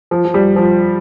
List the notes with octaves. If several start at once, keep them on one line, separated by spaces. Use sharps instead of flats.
F3
F3
G3
F3